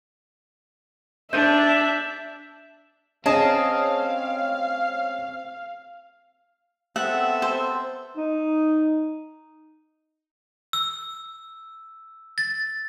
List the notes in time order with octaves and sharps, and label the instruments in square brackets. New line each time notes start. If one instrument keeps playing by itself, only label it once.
[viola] D4 [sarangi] E5 [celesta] G6
[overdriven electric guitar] C4 [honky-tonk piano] C#4 [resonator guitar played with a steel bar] G#4 D#5 A5 [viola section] F5
[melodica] B3 C4 A4 [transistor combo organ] E5 [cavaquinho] F#5
[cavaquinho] C5
[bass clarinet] D#4
[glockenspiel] E6
A6